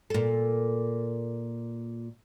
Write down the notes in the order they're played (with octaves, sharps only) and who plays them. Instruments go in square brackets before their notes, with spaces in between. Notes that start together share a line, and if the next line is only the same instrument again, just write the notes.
[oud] A#2 A4